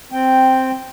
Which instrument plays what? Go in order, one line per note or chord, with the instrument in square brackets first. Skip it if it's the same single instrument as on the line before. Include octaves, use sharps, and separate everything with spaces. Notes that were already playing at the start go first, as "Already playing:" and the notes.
[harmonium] C4 G5